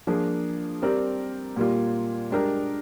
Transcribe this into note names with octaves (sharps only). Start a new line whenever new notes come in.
F3 A#3 D4 G#4
G3 C4 G4 A#4 D5
A#2 G3 A#3 F4
G#3 D4 G4 A#4